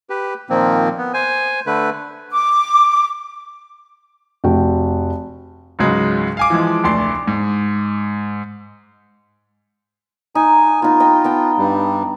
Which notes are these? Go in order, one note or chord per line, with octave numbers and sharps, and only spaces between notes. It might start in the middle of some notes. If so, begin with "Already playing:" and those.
G4 B4
A#2 D#3 F3 A#3 C4
B3
C5 G#5
D3 A3 B4
D6
F1 F#4 G5
C#2 G#2 C#3 F#3 G#3
F5 G#5 D6
E3 F3 G#3
F1 D2 D5 C6
G#2
D#4 G#5
B3 D#4 F4
D#5 G5
B3 G5 A5
G2 G3